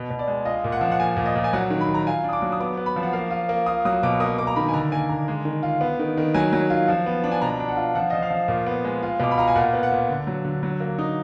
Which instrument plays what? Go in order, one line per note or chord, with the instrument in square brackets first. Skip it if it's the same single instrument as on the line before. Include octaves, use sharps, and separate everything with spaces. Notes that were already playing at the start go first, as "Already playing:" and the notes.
Already playing: [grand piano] B2
B2
D5
G#3
F4 D#5
A#2
F#5
F3
F#5
A#2 G#5
A#2
D#5
A#2
G#5
F#3 F#5
D#3
B5
D#3
A#5
F4 G#5
D4
D#6
D6
F#3
D#6
B3 D6
B3
B5
F3
F#5
A#3 F5
F4
A#3
F4 D#6
F#3 D#6
B2 D6
A#3 D#6
A#3 D6
A#5
D#3 B5
G#5
D3 A#5
A#3 G#5
D3 A#5
G#3
D#3
F4
B3
D#3
D#3
F#3 G#5
F#3
F4
F3
B3
D4
G#5
B2 A#5
D4
F#5
F4
F3 F#5
F3 D#5
F5
F3
A#2
B3
G#3
F4
B2 D6
B5
F4 A#5
G#5
A#2 F#5
B3
F#5
A#2
D3
F#3
D3
F#3
A#3
D#4